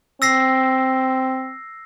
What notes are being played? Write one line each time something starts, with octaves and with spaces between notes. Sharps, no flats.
C4 E6 A#6 C7